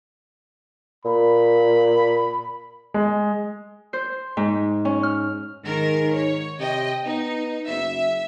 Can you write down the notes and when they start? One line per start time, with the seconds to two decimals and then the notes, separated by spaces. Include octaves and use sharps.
1.05 A#2 B5
2.94 G#3
3.93 C5
4.37 G#2
4.85 C#4
5.03 F6
5.65 G#2 D#3 A#4
6.14 C#5
6.60 C3 D#5 G5
7.05 B3 D#4
7.68 F#1 E5